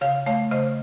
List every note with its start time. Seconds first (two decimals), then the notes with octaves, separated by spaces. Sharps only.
0.01 C#3 C#5 F5
0.26 A3 C#5 F5
0.51 C#3 C5 D#5